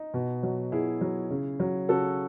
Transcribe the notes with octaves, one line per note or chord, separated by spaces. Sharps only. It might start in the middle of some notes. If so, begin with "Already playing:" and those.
Already playing: D#4
B2
F#3
B2 E4 G#4
F#3
C#3
F#3
C#3 F#4 A4